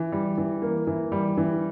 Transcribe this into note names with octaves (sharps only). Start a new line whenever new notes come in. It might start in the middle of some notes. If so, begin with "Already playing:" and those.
Already playing: E3
G3
E3
A#3
E3
G3
E3